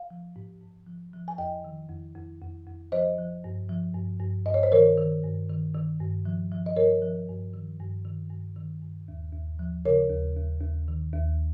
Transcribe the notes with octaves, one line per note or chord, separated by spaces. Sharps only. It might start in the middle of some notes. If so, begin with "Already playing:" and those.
Already playing: F5
F3
G#2
G#2
F3
F3
G#5
F2 D#5 G5
D#3
F2
F2
F2
F2
F3 C5 D#5
F3
G2
F3
G2
G2
G2 D#5
C#5
C5
D#3 A#4 C#5
D#3
G2
D#3
D#3
G2
F3
F3
D#5
G2 A#4 C#5
F3
G2
D#3
G2
D#3
G2
D#3
G2
D#2
D#2
F3
C#3 A#4 C#5
D#2
D#2
D#2
D#3
D#2